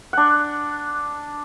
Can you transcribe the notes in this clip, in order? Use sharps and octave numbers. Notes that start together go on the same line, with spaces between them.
D4 F#5